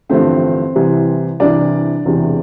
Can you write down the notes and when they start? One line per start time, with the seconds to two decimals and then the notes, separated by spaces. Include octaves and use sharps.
0.09 A1 G2 D3 F3 A3 C4 C5
0.75 C2 C3 E3 G3
1.40 C2 C3 E3 G3 D4 D5
2.05 E1 E2 C3 E3